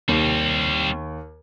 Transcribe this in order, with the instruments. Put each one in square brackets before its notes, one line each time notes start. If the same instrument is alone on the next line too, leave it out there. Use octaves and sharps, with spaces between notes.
[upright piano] D#2 [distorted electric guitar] G3 C4